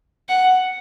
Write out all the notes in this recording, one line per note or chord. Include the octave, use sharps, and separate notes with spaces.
F#5